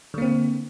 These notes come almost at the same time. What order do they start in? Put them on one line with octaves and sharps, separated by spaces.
D3 A#3 C4